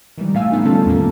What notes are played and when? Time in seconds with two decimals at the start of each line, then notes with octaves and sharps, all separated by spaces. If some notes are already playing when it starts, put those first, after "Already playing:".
0.18 D#3 E3 G3
0.34 A2 A3 F5 G#5 E6
0.51 A3 B3 D#4 F4
0.65 D3 G3 C#4 F4 A4 A5
0.86 E2 A2 D#3 A#3